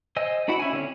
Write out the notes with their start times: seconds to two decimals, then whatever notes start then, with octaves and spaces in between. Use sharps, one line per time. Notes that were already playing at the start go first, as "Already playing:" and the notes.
0.16 C5 D#5 G#5 E6
0.48 D4 E4 F#4 F#5 B5
0.59 C#4 E4 F#4 G#5
0.73 D3 C4 C#4